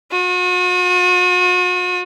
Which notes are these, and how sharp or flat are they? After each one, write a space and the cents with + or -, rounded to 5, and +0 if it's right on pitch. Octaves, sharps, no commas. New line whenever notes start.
F#4 -45